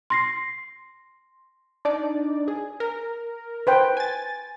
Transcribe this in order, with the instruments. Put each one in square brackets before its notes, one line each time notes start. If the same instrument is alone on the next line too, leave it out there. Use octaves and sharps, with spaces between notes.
[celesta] C6 A#6 C7
[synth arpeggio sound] D4 D#4 D5
G#4
A#4
[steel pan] B4 C5 G5
[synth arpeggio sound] G#5 A6